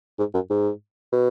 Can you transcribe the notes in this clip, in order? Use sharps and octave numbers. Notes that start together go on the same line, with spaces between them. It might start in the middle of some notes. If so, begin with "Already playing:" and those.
G#2
F#2
G#2
B2